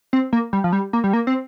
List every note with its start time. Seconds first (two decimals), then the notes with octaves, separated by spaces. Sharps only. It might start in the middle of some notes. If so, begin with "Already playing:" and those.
0.13 C4
0.33 A#3
0.53 G3
0.64 F3
0.72 G3
0.93 A#3
1.04 G3
1.13 A#3
1.27 C4